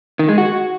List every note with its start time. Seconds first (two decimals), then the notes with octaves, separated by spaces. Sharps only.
0.19 D#3
0.29 G#3
0.38 F#4